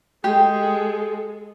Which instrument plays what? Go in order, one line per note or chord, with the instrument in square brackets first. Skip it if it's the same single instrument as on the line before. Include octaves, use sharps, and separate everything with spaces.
[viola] G#3 A4 [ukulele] G4